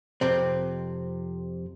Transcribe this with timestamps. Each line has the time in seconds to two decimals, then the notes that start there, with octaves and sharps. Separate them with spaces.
0.21 F2 C3 C4